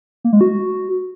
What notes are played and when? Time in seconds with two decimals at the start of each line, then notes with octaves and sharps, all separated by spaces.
0.24 A#3
0.33 G#3
0.41 F#4